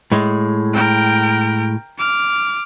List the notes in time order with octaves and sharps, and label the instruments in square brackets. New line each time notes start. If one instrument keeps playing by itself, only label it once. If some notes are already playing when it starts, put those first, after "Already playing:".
[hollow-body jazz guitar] A2 G#3
[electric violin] A#4 G5
D6 F6